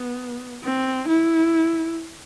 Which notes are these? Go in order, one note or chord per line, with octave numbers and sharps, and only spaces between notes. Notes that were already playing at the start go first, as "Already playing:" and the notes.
Already playing: B3
C4
E4